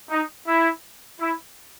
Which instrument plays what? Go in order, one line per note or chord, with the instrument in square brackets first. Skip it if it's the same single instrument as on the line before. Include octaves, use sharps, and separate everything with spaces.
[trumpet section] D#4
E4
E4